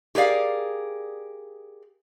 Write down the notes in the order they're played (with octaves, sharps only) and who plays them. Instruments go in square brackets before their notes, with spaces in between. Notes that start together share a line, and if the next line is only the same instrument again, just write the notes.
[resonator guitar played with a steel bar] G4 G#4 A#4 D5 F5